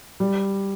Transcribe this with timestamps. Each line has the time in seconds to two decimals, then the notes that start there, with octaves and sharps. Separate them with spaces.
0.20 G3